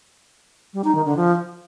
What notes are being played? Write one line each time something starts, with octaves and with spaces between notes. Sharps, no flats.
G3
D#4
D#3
D3
F3